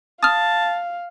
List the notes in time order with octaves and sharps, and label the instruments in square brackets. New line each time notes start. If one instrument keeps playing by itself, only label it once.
[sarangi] F5 [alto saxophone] A5 [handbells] D#6 F6